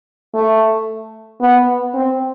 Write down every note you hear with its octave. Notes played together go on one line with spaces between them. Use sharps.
A3
B3
C4